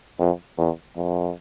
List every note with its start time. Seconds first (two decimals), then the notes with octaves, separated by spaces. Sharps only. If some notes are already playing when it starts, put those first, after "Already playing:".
0.19 F2
0.58 E2
0.97 F2